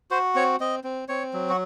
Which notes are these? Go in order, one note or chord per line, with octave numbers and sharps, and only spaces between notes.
F#4 C5
C4 C#5
C4 D#5
C4
C4 C#5
F#3
F#4